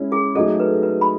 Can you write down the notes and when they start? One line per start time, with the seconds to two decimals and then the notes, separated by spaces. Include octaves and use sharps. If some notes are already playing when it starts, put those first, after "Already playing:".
Already playing: G#3 C#4 E4
0.12 G#4
0.35 F#3 A3 D#4 G#4 A4 D#5
0.60 B4
0.83 B4
1.01 B5